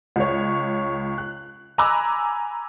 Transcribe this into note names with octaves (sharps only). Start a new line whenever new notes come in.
C#2 C#5
F#6
G#5 A#5 B5 D6 E6 F#6